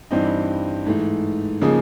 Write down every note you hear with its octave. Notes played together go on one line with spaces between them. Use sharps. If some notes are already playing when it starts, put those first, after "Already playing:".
G2 E3 G3 C4 D#4
G#2 E3 A3
C#3 F3 A#3 D#4 G#4